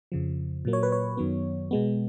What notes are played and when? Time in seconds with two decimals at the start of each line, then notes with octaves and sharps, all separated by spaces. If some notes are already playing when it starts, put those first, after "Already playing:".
0.12 F2 C#3 F3
0.65 A#2 F#3 A#3
0.73 C#5
0.83 B4
0.92 C#5
1.17 F#2 D#3 F#3 B3
1.71 B2 G#3 B3